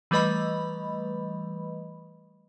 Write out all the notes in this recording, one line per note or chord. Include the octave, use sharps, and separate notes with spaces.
E3 G3 A3 B4 D#5 B5